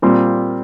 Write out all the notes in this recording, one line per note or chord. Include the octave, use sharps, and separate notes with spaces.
A#2 G3 C4 F4